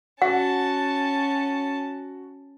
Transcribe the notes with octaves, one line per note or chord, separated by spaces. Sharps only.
C#4 F#4 F#5 A5